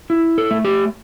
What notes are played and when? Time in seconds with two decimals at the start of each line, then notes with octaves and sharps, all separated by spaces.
0.10 E4
0.38 A4
0.51 A3
0.65 G4